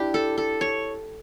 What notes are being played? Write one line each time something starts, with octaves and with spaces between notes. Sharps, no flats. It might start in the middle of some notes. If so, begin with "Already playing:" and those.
Already playing: D4 E4 G4
A4
A4
C#5